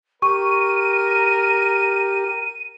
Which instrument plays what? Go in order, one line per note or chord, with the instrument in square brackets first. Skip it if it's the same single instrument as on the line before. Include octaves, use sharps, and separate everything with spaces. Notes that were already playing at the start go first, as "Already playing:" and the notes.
[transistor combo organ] G4 [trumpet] A#4 [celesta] C#6 [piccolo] D#7